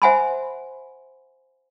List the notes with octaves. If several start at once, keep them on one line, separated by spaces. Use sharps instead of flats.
C5 E5 F#5 G#5 B5 C6